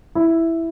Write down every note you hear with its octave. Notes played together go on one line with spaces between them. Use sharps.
E4